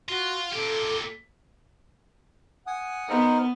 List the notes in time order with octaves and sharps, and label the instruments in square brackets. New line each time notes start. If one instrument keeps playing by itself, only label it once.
[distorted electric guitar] F4 [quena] F#4
[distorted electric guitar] A#2 G4 [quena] A4
[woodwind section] F#5 [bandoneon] G#5 D#6
[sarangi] B3 [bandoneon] D#4 A#4 C5